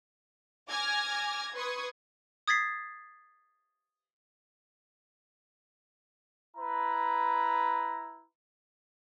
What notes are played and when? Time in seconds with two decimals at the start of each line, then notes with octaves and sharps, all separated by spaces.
0.69 G#5 D6 F6 G#6 A#6
1.54 B4 C6 C#6 D#6 G#6
2.48 D#6 G#6 A6 B6 C7
6.56 E4 B4 A#5